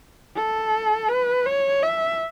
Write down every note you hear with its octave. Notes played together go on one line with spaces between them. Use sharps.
A4
B4
C#5
E5